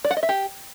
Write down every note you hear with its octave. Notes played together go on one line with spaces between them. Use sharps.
D5
F#5
D#5
E5
G4